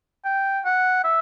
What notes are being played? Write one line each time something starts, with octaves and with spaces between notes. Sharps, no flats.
G5
F#5
E5